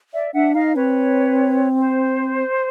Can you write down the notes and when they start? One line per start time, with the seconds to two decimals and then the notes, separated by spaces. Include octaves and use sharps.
0.13 D5 E5
0.34 D4 E5 F#5
0.55 D#4 D#5 F5
0.75 C4 B4 C#5
1.79 C5